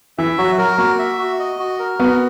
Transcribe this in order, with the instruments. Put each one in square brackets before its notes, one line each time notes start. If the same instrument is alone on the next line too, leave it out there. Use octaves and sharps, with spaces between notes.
[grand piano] E3 [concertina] E5
[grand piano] F#3 [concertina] F#4
[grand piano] F#3 [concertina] A#4
[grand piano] A#3 [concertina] F#4
[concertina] E5
F#4
D#5
F#4
A#4
[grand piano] B3 [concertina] F#4